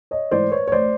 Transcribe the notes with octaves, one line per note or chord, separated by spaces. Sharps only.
C#5 D#5
G#2 E3 A3 C5 D5
B4 C#5
C#5
A1 C5 D5